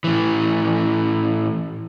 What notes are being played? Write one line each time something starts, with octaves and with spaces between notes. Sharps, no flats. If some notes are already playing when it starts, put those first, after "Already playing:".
A2 E3